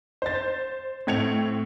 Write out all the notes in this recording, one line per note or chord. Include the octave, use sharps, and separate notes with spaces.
C5 A6
A2 C4 G#6 C#7 F7